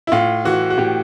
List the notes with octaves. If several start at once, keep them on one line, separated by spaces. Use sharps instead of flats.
E4
A2 F4
E3 F#4
F#4
A2 G4